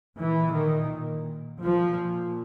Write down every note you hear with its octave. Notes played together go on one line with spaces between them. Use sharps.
A#2 E3
D#3
A#2 F3